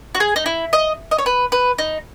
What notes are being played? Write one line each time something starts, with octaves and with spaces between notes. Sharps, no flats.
F#4
G#4
D#4
E4
D#5
D#5
C#5
B4
B4
D#4